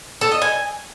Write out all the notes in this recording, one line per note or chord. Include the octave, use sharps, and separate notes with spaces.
A4
D#5
G#5